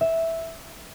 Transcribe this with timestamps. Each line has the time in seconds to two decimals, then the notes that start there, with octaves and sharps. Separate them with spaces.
0.01 E5